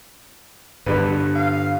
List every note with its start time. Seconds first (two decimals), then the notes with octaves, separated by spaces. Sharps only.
0.86 G2 D3 G3 B4
1.35 F5